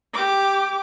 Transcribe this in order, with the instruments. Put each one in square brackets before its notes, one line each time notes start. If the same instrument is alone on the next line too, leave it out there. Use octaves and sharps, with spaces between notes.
[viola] G4 D6